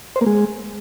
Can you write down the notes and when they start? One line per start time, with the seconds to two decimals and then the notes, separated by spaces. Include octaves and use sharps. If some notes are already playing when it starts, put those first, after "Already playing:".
0.16 C5
0.21 A#3
0.26 G#3